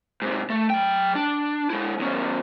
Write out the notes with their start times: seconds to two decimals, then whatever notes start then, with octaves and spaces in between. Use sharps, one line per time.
0.22 G#2 C3
0.50 A3
0.70 F#3 G5
1.15 D4
1.70 G#3 E4
1.99 E2 C#4